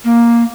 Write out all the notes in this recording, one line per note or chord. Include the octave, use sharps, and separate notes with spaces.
A#3